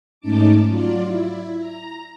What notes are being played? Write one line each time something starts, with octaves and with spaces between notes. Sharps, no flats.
G#2 A3 C#4 D#4 A5 D6
F#3 F4 D5
E4
A#5